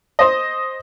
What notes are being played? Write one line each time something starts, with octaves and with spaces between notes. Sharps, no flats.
C5 D#5